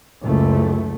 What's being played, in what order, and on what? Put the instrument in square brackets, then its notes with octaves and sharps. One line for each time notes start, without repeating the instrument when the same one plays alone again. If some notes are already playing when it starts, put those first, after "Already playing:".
[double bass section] F#1 C#2 A3